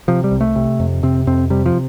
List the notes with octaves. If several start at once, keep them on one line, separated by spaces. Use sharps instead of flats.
C3 F3
G3
C2
A3
C3
F2
C3 C4
F2 C4
C3 G3
F3